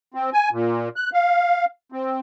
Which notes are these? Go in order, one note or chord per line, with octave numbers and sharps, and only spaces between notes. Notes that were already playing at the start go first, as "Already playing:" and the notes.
C4
G#5
A#2
F#6
F5
C4